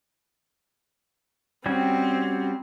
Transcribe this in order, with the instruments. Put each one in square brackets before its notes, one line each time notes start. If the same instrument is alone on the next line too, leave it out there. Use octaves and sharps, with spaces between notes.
[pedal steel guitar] G3 C#4 F#4 [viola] C4